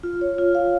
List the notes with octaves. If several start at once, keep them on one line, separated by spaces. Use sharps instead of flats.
F4
C#5
F4
F5